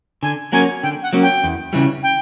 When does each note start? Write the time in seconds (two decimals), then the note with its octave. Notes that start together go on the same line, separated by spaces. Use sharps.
0.22 D3 G#5
0.52 F#3 A#3 C#4 G#5
0.83 D3 G5
1.02 F#5
1.13 F#3 A#3 C#4
1.22 G5
1.44 E2
1.73 C#3 E3 G3
2.03 G5